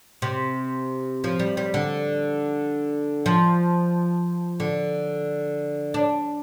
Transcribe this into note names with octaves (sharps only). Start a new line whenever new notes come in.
C3
F3
G3
G3
D3
F3
D3
D4